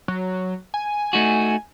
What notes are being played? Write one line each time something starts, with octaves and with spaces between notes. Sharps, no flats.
F#3
G#5
A3 D#4 F#4